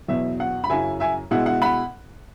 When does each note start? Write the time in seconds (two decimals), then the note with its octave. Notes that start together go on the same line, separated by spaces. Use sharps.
0.08 E2 B2 F#3 E5
0.40 F#5
0.64 B5
0.69 F#2 C#3 F#3 E4 E5 G#5
1.00 E5 G#5
1.31 B2 G#3 E4 F#5
1.46 F#5
1.62 F#5 B5